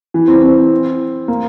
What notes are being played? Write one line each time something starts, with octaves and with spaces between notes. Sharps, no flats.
E3
C4
C4
A#3